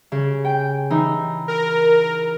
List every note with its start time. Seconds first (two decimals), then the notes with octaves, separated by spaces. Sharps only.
0.12 C#3
0.45 G5
0.90 E3 D#4
1.48 A#4